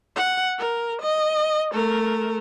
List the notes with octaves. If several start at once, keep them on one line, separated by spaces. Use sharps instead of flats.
F#5
A#4
D#5
A3 A#4